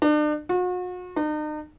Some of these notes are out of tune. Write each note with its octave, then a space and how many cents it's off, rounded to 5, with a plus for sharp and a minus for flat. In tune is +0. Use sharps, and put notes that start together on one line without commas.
D4 +40
F#4 -40
D#4 -40